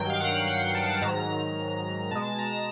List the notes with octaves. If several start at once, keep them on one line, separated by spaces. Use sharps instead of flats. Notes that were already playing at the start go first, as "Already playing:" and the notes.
Already playing: G2 D#3 F#3 G5
F5
F#5
G5
A5
A5
G#2 D#3 F#3 A#5
B2 G#3 A5
A#5